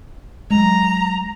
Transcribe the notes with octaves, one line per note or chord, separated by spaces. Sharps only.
F#3 G#3 A#5